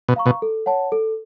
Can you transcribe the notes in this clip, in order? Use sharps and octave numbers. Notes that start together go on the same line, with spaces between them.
B2
F5 A#5 C#6
B2
A4
C#5 F#5 A5
A4